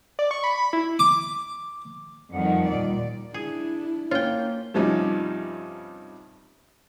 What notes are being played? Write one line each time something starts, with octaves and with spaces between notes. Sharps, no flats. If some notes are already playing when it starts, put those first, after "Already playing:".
D5
C#6
B5
B5
E4
D6
F2 D#3 F3 G3 F#5
D#2 A#2 G3 D5
D4 E4 G#4
A#3 C#4 F4 G5
G2 C3 F3 G3 C#4 D#4